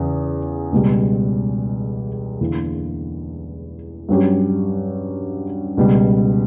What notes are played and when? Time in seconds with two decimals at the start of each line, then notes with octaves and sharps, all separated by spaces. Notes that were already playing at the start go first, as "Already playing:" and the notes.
Already playing: E2 C#3
0.72 C#2 B2 G3
2.40 E2 D3 A#3 E4
4.09 G2 F#3 C#4 G4
5.77 C#2 B2 G3